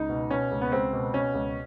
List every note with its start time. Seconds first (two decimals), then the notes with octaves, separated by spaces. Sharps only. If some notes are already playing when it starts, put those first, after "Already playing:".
Already playing: C#2 D#4
0.09 B2
0.30 B2 C#4
0.51 C#2
0.62 B3
0.72 C#2 C4
0.93 B2
1.14 B2 C#4
1.34 C#2